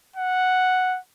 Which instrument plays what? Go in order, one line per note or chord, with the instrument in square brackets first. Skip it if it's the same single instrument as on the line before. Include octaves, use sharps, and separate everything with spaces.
[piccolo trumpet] F#5